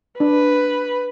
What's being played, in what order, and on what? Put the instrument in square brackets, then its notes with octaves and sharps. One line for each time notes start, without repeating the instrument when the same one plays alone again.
[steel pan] D4 [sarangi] B4